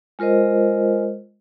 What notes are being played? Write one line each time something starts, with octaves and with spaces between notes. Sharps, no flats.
G#3 F4 A#4 C5 D#5